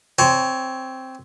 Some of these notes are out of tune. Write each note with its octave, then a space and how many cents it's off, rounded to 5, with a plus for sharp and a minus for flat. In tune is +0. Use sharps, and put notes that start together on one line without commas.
C4 +0 C#5 +15 A5 -35